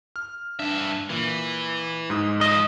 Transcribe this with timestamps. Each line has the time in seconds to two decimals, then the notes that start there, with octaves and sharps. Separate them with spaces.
0.16 F6
0.59 G2 D4 E5
1.10 A#2 E3
2.10 G#2 G#3 D#6
2.41 F3 D#5